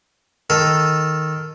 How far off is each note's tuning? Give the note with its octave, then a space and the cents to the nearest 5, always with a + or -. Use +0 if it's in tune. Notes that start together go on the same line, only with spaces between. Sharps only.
D#3 +0 A4 +0